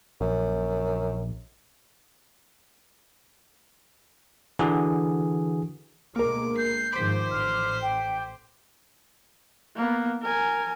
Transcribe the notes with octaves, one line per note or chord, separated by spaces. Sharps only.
A#1 F#2
D3 E3 F#4 G#4
D2 B2 G#3 A#3 A#4 D6
G6 C7
G#2 D#3 F3 C5 C6 D6 B6
A1 F6
G5
A#3 B3
A#4 G#5